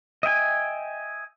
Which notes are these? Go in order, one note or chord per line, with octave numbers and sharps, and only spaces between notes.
D#5 E5 G5 G#5